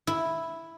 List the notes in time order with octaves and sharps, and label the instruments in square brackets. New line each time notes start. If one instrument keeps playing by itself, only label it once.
[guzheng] E4